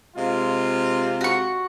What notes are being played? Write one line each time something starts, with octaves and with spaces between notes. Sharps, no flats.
C3 G#3 F4
F#4 C#6